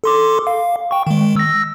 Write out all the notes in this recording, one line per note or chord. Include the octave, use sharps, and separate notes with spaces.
A4 C6 D6
F5
G5 C#6
D#3 G#3
E6 A#6